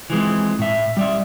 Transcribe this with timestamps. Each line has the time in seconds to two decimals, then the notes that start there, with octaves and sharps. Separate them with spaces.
0.10 E3 F3 G#3 C4
0.59 A2 E5
0.97 G3 D5 E5